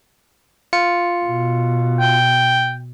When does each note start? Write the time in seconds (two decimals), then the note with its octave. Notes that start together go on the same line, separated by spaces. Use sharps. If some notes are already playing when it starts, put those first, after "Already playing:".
0.73 F4 C#7
1.25 B2
2.00 G5